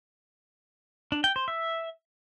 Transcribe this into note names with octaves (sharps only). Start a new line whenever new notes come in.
D4
G5
C5
E5